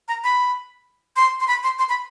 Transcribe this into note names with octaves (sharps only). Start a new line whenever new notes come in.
A#5
B5
C6
C6
B5
C6
C6
B5